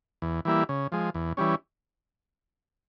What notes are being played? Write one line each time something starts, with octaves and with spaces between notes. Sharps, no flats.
E2
E3 G3 A#3 E4
C#3
F3 G#3
E2
E3 G3 C#4